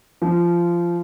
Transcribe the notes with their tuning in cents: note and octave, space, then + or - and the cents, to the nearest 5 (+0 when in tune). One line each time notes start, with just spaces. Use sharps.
F3 -20